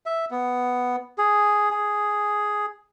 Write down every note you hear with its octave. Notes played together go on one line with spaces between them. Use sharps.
E5
B3
G#4
G#4